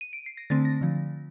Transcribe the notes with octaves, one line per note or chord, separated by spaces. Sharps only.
D#7
D7
C7
A#6
D3 A3 C4 A6
A#6
D3 F3